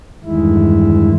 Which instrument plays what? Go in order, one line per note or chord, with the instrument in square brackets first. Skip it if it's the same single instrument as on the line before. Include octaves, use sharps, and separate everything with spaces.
[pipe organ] E2 G2 D#3 G#3 E4